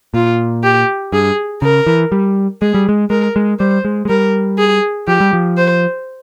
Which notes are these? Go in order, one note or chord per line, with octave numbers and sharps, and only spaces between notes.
A#2 F4
G4
G2 G#4
C#3 A#4
E3
G3
G#3 G#4
G3
G#3
G#3 A#4
G#3
G3 C5
G#3
G#3
G3 A#4
G#4
F3 G4
G3
F3
C5